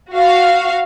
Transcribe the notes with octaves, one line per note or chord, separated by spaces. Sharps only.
F#4 F5